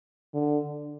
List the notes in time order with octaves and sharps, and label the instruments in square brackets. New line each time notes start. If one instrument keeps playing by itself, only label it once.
[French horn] D3